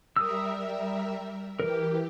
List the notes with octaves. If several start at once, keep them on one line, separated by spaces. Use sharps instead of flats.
G3 A#4 E5 D#6 E6
E3 G4 A#4